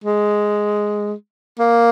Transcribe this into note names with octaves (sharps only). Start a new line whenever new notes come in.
G#3
A#3